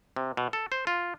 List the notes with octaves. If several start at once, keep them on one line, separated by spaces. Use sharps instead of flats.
C3
B2
A4
C5
F4